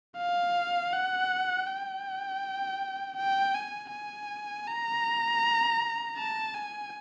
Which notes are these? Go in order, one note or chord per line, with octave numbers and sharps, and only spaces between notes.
F5
F#5
G5
G5
G#5
G#5
A#5
A5
G#5